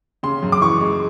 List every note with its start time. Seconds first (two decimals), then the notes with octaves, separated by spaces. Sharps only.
0.23 C#3 C6
0.43 F#2
0.52 D6
0.61 E3 C#6
0.81 G#3